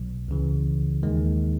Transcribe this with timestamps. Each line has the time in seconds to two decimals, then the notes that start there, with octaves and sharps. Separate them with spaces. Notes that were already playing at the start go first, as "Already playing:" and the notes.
Already playing: B1 B2 F#3
0.28 C#2 C#3 E3
1.03 D#2 D#3 G#3